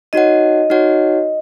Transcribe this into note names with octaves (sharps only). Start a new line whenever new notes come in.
D#4 F#4 C#5 D#5 F#5
D#4 F#4 C#5 F#5